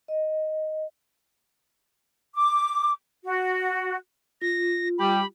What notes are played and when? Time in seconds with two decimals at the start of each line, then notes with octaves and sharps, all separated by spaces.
0.08 D#5
2.36 D6
3.23 F#4
4.42 F4 A#6
4.98 G3 G4 B5